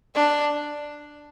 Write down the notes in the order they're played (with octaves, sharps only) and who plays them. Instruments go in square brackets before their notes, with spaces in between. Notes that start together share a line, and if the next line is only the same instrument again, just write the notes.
[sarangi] D4